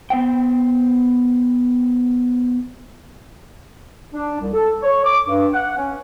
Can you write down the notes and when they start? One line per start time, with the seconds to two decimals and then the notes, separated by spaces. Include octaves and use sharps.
0.10 B3 C5 G5
4.14 D4
4.41 C2
4.54 A4
4.83 C#5
5.05 D6
5.27 G2
5.53 F#5
5.76 C#4